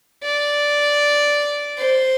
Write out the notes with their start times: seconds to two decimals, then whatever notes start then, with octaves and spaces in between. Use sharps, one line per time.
0.24 D5
1.78 C5